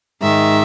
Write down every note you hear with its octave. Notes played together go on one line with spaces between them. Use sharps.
G#2 D#3 E5